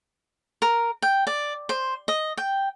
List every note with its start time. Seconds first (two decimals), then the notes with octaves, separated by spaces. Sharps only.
0.62 A#4
1.02 G5
1.27 D5
1.69 C5
2.08 D#5
2.37 G5